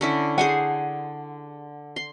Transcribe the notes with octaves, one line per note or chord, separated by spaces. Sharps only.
D3 C#4 E4
G#4 C5 F#5 G#5
C6